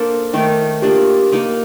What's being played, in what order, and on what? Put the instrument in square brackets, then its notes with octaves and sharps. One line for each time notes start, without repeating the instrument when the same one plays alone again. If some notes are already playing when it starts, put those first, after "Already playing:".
Already playing: [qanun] A#3 D4 A4 C5
D#3 A3 D#4 A#4
[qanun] A#3 D4 F4 [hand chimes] G4
[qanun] A#3 D#4 A#4